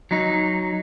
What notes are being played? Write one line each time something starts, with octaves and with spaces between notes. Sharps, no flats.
F#3 D#4